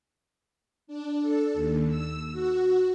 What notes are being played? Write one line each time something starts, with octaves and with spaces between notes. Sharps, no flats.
D4
A4
D#2
E6
F#4